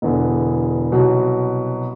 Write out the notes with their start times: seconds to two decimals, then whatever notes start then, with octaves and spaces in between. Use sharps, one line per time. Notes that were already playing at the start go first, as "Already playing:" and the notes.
0.02 E1 E2 D3
0.92 C2 B2 F#3